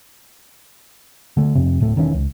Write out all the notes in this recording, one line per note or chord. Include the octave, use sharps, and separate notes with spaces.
D3 A3
F2 C3
D1 A2 A3
E1 D#3 E3 C#4
C#2